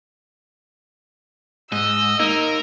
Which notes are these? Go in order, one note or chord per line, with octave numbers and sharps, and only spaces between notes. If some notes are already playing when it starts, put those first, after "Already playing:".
G#2 D#5 E6
A#3 D#4 A#4